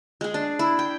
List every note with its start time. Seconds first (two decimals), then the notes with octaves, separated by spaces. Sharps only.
0.21 G#3 G#4
0.34 D4
0.59 E4
0.79 G5